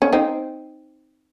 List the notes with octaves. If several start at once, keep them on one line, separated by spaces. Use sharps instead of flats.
C#4
C4 D#4